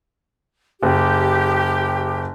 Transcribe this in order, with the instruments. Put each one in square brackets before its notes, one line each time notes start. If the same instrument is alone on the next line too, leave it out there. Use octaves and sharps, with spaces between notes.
[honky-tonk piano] F#1 [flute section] G4